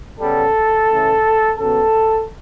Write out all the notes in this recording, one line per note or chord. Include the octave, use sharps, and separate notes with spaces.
C#3 G3 B3 A4
C#3 E3 A3
C#3 F#3 B3 A4